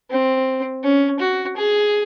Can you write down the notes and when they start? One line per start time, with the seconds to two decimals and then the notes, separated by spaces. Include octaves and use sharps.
0.10 C4
0.83 C#4
1.20 F#4
1.57 G#4